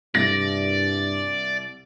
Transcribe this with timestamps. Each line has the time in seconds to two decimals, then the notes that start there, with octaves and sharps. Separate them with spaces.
0.15 C2 G2 D5 A#6